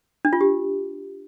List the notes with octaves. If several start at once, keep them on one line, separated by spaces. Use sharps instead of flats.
D4
F4
G4